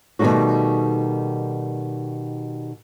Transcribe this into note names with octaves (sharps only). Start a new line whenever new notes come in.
B2 D#3 G3 A3 D#4 F#4